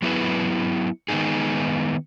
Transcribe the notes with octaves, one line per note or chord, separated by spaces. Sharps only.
F#3 B3 E4 G#4 B4
D#3 G#3 B3 D#4 G#4